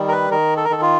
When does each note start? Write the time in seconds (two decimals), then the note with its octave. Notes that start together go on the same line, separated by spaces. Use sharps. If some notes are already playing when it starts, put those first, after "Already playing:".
Already playing: D#3 G3
0.08 A#4
0.12 B4
0.31 D#3 A#4
0.57 A4
0.64 A#4
0.70 D#3 A4
0.82 F4